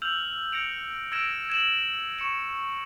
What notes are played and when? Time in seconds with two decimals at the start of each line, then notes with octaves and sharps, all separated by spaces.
0.02 E6 F6 G6 F7 F#7
0.52 G6 A#6 C#7 D7 F7
1.12 E6 G#6 A#6 D7 E7 F7
1.50 G#6 E7 F#7
2.19 C#6 C#7 E7